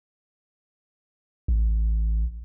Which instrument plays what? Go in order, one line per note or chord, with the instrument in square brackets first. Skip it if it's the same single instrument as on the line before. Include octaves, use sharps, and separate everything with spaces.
[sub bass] A1